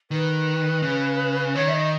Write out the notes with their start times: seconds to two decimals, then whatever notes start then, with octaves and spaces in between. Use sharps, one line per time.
0.10 D#3 B4
0.83 C#3
1.55 D#3 C#5
1.68 E5
1.73 D#5